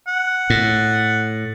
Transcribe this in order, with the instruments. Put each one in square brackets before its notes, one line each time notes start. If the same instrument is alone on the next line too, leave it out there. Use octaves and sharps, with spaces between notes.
[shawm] F#5
[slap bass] A2